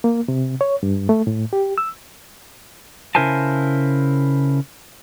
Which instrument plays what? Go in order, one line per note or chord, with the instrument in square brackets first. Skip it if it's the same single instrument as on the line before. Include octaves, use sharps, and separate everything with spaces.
[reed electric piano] A#3
C3
C#5
G2
A3
A2
G4
E6
[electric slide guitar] C#3 E4 A#4 C5 G#5 A5